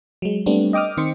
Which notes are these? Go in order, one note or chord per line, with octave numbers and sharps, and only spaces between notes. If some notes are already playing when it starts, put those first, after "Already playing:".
F#3 G#3
G3 A3 B3 C4 D4
D#5 G5 D6 D#6 F6
D#3 C4 C5 C#7